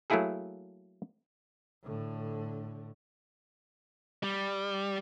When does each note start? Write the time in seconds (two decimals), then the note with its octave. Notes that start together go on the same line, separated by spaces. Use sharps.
0.10 F#3 A3 A#3 E4 G#4 A4
1.83 A2 D3
4.23 G3